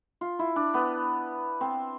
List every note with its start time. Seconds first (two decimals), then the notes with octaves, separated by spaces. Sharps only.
0.21 F4
0.39 E4
0.56 D4
0.74 B3
1.61 C4